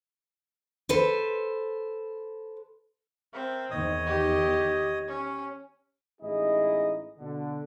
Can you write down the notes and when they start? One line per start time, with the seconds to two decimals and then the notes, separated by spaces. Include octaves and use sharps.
0.89 A4 B4 C5
3.33 C4 A#4 E5
3.70 E2 D#3 C#5 D#5 D#6
4.06 G4
5.08 C#4
6.21 A1 G#3 D#4 E4 G#4 D#5
7.19 B2 D3